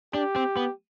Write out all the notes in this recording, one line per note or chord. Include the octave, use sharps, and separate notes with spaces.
D4 G4
C4
B3